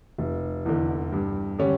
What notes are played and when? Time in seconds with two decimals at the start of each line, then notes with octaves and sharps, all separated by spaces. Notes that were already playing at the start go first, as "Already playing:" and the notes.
0.18 F1
0.65 E2 D3
1.12 G2
1.59 D3 G3 C#4